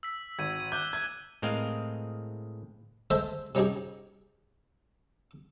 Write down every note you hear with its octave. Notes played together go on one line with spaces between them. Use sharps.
E6 B6
G#1 G#6 D#7
D#7
D6 F#6 G6 G7
G#6
A2 G#3 C4 A#4 D#5 F5
G#3 A4 C5 E5
C3 C#4 D#4 G4 G#4